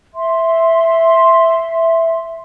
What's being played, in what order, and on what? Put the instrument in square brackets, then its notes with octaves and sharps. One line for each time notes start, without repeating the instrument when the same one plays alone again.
[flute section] E5 C6